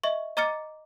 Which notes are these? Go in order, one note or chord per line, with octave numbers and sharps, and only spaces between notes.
D#5 E5 C#6
D#5 A#5 D6 F6 A6 C#7